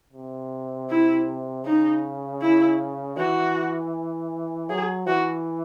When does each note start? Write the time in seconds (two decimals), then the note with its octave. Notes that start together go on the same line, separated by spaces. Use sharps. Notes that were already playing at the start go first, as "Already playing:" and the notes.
0.13 C3
0.90 E4
1.65 C#3 D#4
2.42 E4
3.17 E3 F#4
4.70 F#3 G#4
5.07 E3 F#4